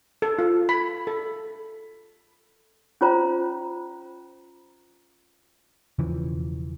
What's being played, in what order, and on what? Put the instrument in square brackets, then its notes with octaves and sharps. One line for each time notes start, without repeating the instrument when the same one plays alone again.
[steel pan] A4
F4
B5
A4
[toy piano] C#4 F4 C5 A#5
[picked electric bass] E1 C#3 E3 F3